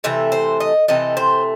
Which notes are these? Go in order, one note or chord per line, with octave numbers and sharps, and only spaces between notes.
C3 E3 A3 E5
C5
D#5
C3 E3 A3 D#5
C5